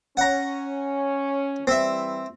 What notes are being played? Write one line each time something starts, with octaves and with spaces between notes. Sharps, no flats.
C#4 F#5 A#5
E3 G3 C4 E5